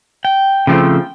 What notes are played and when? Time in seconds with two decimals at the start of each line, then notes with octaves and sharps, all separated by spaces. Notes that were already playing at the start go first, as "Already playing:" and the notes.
0.25 G5
0.67 C#3 F3 A3 C4